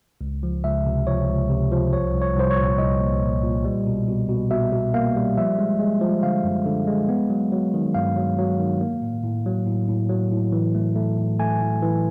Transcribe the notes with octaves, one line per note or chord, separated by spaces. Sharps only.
C#2
F3
C#2 E5
C3
F3 C#5
C#2
C3
F3
C2 C#5
C2
C#5
C2 C5
C#5
A#2
C2 D#5
A#3
A#2
A#2
G3
B2
B2
B2
B2 E5
B2
A#3 F5
G3
F3 E5
G#3
G#3
F3
D3 F5
F#2
D3
G#3
B3
F#3
F#3
D#3
G2 F5
F#3
F#3
D#3
A#3
A2
A2
F#3
A2
A2
F#3
A2
E3
A3
A3
A2
A3 G#5
A2
E3